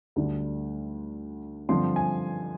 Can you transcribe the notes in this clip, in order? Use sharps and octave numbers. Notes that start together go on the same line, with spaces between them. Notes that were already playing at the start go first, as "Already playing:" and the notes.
D2 D3 G3 D4
G2 D3 F3 C4 C6
G#5